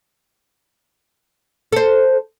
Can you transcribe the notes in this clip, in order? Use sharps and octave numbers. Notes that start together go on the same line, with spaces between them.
A4 C5